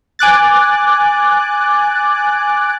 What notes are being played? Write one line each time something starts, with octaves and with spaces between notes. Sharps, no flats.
G#5 D6 F#6 A6